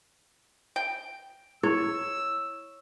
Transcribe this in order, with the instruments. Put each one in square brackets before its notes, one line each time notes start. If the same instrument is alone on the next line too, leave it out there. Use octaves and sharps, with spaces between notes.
[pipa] G5
[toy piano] E4 [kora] C#5 [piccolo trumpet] E6